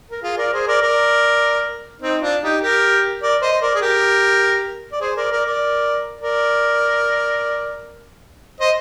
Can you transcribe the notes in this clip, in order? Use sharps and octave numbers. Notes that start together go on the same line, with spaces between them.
A#4
F4 G#4
A#4 D5
G#4 C5
A#4 D5
A#4 D5
C4 D#4
D4 F4
D#4 G4
G4 A#4
A#4 D5
C5 D#5
C5
A#4 D5
G#4
G4 A#4
D5
G#4 C5
A#4 D5
A#4 D5
A#4 D5
A#4 D5
C5 D#5